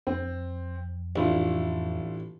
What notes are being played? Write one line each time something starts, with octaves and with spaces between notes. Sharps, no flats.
F2 C4
A1 D4 E4 F4